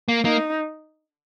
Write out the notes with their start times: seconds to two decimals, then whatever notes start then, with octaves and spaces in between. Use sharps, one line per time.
0.08 A#3
0.25 A#3 D#4